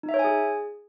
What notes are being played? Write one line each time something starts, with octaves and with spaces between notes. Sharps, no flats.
D#4
E5
C#5
G#5
G#4